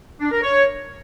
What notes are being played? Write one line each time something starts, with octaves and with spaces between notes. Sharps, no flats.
D4
A#4
C#5